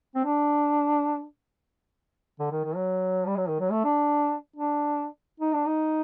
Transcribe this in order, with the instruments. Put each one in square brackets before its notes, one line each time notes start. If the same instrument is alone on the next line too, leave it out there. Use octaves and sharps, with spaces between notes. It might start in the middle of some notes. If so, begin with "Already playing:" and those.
[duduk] C4
D4
D3
D#3
D#3
F#3
G3
F#3
D#3
F#3
A3
D4
D4
D#4
D4
D#4